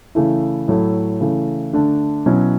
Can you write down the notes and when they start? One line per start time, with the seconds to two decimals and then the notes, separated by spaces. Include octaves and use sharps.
0.15 C#3 E3 A3 E4
0.68 A2 F#3 A3 E4
1.21 C#3 E3 A3
1.73 D3 A3 D4
2.26 B2 F#3 C#4 E4